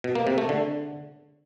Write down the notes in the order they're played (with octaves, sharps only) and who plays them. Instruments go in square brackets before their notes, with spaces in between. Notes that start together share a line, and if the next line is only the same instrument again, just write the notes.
[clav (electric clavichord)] B2
A#3
C3
A3
D3